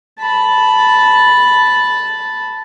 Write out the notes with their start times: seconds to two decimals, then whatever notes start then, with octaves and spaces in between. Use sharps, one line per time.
0.19 A5 B5